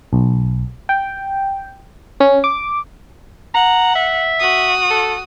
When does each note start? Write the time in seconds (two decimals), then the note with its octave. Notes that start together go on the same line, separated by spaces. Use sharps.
0.13 B1
0.89 G5
2.20 C#4
2.44 D6
3.55 F#5 A#5
3.95 E5
4.39 F#4 D#6
4.90 A4